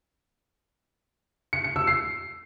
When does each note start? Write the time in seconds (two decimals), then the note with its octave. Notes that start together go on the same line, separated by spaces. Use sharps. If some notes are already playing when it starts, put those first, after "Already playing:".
1.53 C#7
1.64 C#7
1.76 E6
1.87 C7